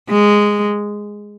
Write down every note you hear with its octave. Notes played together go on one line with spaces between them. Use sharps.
G#3